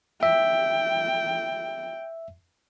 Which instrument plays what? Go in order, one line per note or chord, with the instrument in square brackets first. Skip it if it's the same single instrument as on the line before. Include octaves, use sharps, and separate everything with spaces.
[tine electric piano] E5 [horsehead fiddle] G5